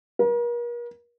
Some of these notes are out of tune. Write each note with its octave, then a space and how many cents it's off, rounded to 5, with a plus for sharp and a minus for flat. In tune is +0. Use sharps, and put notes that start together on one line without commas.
A#4 +40